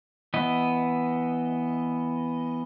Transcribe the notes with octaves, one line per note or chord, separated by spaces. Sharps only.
E3 B3 D#5